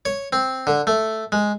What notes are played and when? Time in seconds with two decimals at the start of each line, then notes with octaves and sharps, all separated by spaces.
0.05 C#5
0.33 C4
0.67 D3
0.87 A3
1.32 G#3